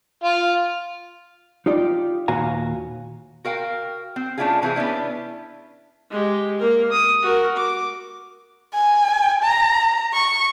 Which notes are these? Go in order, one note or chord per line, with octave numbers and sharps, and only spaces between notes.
F4
D#4 F4 G4 D5
D#2 A#2 F#4 F5 G#5 A#5
F#4 A#4 F5 G5
C4
A3 C#4 D4 E4 F4 G#4
C3 E3 C4 E4 G#4
B3 C#4 D4 E4
G#3 G4
A#3 A#4
D#6
F#4 A#4
D6
G#5
A#5
C#6